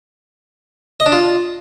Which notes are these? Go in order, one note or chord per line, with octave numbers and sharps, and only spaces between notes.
D#5
D4
F4